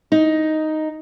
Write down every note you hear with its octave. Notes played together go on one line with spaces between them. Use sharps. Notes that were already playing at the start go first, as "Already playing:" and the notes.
D#4